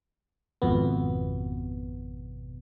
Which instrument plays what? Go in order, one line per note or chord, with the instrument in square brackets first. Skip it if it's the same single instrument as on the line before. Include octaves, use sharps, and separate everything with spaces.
[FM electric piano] G#1 F2 B2 B3